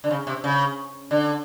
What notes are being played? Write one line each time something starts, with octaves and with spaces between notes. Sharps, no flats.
D3
C#3
C3
C#3
D3